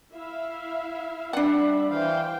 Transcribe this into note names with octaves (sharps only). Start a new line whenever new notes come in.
E4 E5 F5
G3 D4 D5 E5 F#5 B5
E3 C5 F5 G5